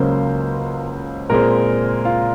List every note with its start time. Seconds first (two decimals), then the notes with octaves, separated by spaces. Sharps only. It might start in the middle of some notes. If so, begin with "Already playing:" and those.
Already playing: C#2 C#3 F#3 A#3 C5
1.30 A#2 G#3 C4 A#4
2.05 F4